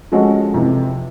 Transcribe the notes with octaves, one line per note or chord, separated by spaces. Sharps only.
F3 G#3 C#4 F#4 A4
F2 C3 E3